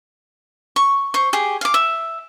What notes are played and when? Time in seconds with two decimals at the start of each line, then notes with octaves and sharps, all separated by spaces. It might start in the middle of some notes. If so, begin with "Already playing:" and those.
0.76 C#6
1.14 C5 C#6
1.33 G4 G#4
1.61 F5 D6
1.74 E5